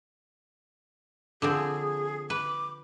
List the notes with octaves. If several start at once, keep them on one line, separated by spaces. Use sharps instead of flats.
D3 F3 C4 G#4
B4 D6